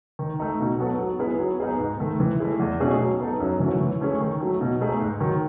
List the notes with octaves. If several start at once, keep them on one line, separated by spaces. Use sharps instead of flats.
D#3
A3 D#4
B2
F#3 B3 F#4 A4
F#3
B3 E4 G#4
F#3
B3 D#4 G#4
G#2
D#3 A3
E3
A3 E4 G#4
E2
B2 A3 C#4 G#4
F#3
B3 D#4 A4
F#2
E3 A3 C#4 F#4
E3
A3 C#4 G#4
D#3
F#3 A3
B2
A3 D#4 G#4
G#2
D#3 F#3